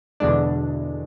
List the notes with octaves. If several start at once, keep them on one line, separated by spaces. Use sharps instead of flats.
E2 B2 D3 G#3 D4